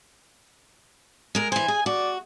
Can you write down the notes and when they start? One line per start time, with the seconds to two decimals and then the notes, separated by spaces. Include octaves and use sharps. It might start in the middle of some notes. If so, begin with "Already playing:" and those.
1.35 G#3 A#4
1.52 E3 C5 G#5
1.68 G#4
1.86 F#4 D5